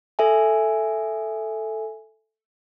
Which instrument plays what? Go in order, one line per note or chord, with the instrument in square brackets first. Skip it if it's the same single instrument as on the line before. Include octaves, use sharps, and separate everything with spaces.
[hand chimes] A4 E5 G#5